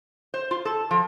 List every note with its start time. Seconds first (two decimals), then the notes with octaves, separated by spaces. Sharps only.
0.34 C5
0.51 F4
0.65 A4
0.91 F3